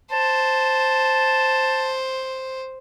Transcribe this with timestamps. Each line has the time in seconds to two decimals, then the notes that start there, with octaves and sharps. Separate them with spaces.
0.12 C5 A5